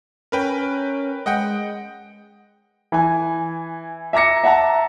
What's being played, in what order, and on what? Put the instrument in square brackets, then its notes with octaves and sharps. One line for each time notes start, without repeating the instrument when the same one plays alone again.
[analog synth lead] C#4 [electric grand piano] A#4 B4 G5
[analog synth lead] G#3 [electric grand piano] D#5 F#5 G5
[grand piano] E3 G#5
E5 A#5 D6 A#6 C#7
E5 F#5 A5 A#5